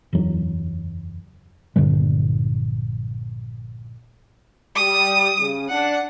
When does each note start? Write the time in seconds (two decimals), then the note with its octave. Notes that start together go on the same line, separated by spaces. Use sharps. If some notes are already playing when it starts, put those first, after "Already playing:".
0.13 F#1 E2 E3 F#3
1.76 A#1 G2 D3 G3
4.76 G3 D#6
5.39 C#3
5.69 D4 F#5